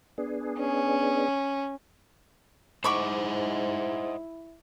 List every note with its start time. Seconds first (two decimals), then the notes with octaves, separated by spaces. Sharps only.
0.18 B3 D4 G#4
0.59 C#4
2.84 G#2 E4 C5 D#5 F#5 B5 C#6 D6